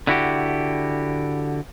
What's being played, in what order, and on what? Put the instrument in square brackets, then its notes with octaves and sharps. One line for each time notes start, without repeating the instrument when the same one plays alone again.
[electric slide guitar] D3 E4 F#4 G4